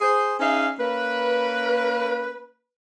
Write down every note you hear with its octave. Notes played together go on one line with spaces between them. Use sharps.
G#4 C5
C#4 D#4 G#4 E5 F5
A#3 C#4 B4